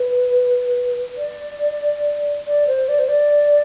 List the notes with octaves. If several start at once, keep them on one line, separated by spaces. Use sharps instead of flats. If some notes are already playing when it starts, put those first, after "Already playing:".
Already playing: B4
D5
D5
C5
D5
C5
D5